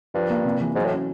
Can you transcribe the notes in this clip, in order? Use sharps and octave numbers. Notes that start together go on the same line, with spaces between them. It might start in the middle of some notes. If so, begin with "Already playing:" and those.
G2 F3
A#3
C3
E3
G#2 F#3
A2
C#4